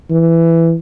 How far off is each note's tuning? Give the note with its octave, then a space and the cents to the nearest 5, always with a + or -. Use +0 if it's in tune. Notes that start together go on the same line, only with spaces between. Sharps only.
E3 +10